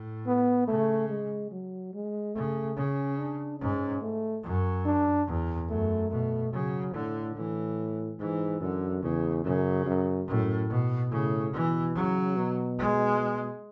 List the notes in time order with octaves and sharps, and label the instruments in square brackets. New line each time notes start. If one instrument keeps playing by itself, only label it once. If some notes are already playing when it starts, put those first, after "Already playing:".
Already playing: [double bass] A2
[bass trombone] B3
[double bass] C#3 [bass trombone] A3
[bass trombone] G#3
F#3
G#3
[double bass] C#3 [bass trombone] A3
[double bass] C#3 [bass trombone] C#4
[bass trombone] D4
[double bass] G#2 [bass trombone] C#4
[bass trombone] A3
[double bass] F#2
[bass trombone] D4
[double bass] E2
[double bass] F#2 [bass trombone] A3
[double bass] B2 [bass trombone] A3
[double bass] C#3 [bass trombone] F#3
[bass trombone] A2 [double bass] D3
[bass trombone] A2 [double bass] E3
[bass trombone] G#2 [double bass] E3
[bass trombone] F#2 [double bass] D3
[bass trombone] E2 [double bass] C#3
[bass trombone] F#2 [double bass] C#3
[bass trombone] F#2
[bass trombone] F#2 [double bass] A2
[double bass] B2
[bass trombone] A2 [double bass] C#3
[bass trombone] B2 [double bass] E3
[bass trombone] C#3 [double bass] F#3
[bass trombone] B2
[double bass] G#3